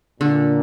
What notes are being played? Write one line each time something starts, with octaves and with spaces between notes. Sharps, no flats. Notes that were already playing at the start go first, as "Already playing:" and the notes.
A#2 D3